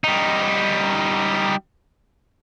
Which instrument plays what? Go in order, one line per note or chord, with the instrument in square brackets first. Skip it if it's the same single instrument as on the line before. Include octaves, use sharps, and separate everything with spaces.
[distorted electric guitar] G3 D#4